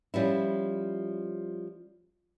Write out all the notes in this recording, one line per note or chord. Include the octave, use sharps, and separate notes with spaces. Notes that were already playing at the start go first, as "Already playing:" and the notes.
F3 G3 C#4 E4